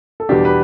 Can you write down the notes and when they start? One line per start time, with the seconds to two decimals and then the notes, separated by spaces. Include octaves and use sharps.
0.20 A4
0.29 E2 B2 G3 D4 G4
0.45 B4